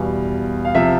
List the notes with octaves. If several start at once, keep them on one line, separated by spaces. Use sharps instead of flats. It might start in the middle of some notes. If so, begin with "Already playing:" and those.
Already playing: E2 B2 G3 F5
F5
C3 F3 E5